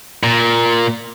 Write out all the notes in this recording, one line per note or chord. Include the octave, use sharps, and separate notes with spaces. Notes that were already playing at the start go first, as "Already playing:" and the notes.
A#2